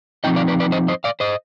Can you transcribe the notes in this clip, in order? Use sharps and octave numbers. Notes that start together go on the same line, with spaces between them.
F3 C4 D#4 D#5 G5
D5 F5
B4 D5
B4 D5
C5 D#5
C5 D#5
D5 F5
C5 D#5